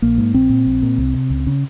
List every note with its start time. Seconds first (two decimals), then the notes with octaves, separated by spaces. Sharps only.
0.02 A#1 A#3
0.18 G#2
0.34 A#1 C4
0.50 A#2
0.66 A#1
0.83 A#2
0.98 C2
1.14 C3
1.30 C#2
1.47 C#3